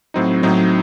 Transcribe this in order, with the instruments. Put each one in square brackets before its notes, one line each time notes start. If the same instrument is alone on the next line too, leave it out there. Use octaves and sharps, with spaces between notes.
[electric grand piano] A2 F#3 C4 D#4
A2 F#3 C4 D#4